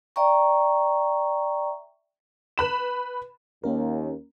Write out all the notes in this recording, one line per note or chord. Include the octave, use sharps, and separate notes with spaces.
D5 E5 G5 A#5 C#6
B4 B5 E7
D#2 A#3 C#4 A#4